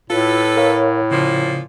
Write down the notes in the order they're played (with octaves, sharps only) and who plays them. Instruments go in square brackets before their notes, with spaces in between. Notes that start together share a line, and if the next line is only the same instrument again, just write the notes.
[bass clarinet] A2 [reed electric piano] F4 [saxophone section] A4 B4
[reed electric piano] A#4 C#5 F5
[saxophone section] A#2 F3 [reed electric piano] C#3